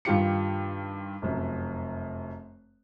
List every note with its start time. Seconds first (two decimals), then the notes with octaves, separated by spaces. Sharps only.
0.05 G2 D#3 F4 G4 C#7
1.22 F1 F#2